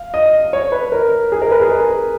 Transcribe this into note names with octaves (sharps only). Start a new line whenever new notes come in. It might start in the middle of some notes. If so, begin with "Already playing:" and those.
Already playing: F5
D#5
C#5
B4
A#4
G#4
A#4
B4
G#4
A#4